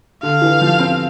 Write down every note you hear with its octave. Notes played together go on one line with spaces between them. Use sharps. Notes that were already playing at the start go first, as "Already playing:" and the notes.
D3 F5
E3
F3
C4